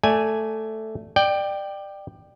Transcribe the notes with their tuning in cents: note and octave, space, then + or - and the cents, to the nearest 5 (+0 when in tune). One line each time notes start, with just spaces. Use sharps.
A3 +0 D5 -10 G#5 +0
D5 +25 G5 +0